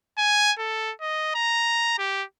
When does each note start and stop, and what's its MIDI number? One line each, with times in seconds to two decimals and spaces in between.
0.18 0.53 80
0.59 0.93 69
1.01 1.31 75
1.35 1.98 82
1.99 2.24 67